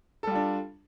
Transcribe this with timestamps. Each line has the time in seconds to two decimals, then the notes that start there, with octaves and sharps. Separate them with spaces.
0.23 A4
0.27 G3
0.31 F4
0.35 D4